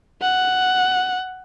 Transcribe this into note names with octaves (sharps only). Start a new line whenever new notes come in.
F#5